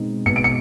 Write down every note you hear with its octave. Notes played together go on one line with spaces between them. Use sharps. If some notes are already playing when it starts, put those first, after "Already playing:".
Already playing: B2 G#3 C4 D#4
B2 C#7
D7
C#7